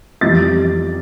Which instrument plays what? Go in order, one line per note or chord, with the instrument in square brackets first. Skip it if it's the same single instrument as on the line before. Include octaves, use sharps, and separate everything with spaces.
[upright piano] F2 E3 G3 A6